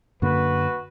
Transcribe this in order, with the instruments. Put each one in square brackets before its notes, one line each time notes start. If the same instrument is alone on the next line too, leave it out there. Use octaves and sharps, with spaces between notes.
[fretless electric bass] F#2 D3 A#3 [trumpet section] F#4 B4